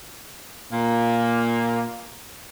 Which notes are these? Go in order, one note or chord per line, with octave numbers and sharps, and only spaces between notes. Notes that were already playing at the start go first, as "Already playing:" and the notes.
A#2 A#3